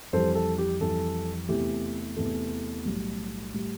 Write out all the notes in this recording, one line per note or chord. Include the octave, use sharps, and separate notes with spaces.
F2 E3 G3 A4 C5
A4
G4
F2 E3 G3 A4
E2 C3 E3 A3 G4
E2 C3 E3 A3 A4
B1 A2 G3
A2 G3